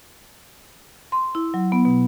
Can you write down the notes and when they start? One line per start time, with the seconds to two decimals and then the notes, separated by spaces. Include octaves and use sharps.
1.12 C6
1.35 E4
1.54 F#3
1.72 B3
1.85 B2